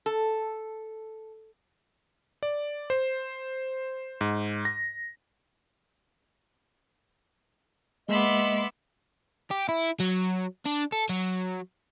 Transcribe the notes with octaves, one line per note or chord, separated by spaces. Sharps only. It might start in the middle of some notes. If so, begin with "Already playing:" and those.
A4
D5
C5
G#2
A#6
G#3 A#3 B3 D#5 E5 B5 C6 D6
G4
E4
F#3
D4
A4
F#3